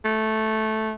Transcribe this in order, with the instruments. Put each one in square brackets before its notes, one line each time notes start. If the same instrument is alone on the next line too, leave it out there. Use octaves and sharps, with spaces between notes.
[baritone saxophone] A3